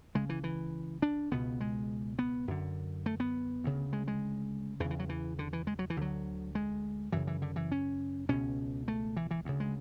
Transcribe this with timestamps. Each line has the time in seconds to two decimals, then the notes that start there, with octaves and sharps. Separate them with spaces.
0.15 C#2 C#3 G#3
0.29 E3
0.44 E3
1.02 D4
1.31 C#2 B2 B3
1.61 G#3
2.19 B3
2.47 F#2 D3
3.06 A3
3.20 B3
3.64 D2 C#3
3.93 G#3
4.08 G#3
4.80 E2 E3
4.85 C#3
4.90 E3
4.99 F#3
5.09 E3
5.39 D3
5.53 E3
5.67 G#3
5.79 F#3
5.90 E3
5.97 D2 D3 F#3
6.55 G#3
7.12 F#2 C#3 E3
7.27 E3
7.42 D3
7.56 E3
7.72 C#4
8.29 C#2 B2 C#4
8.88 A3
9.17 E3
9.31 E3
9.45 D2 C#3
9.60 G#3